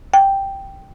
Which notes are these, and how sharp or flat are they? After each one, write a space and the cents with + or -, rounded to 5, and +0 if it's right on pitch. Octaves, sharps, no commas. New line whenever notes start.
G5 +0